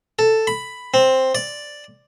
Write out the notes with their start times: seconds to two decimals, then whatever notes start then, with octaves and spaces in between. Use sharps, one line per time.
0.19 A4
0.47 B5
0.94 C4
1.35 D5